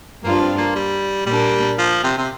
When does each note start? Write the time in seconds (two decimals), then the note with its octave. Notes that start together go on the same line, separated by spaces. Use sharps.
0.23 G2 F3 A#3 D4 F4
0.41 C4
0.58 A#3
0.75 G3
1.26 A#2 G3 A#3 D4
1.78 F3
2.04 C3
2.18 C3